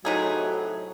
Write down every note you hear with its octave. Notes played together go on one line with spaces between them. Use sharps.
A2 C3 F#3 D#4 G#4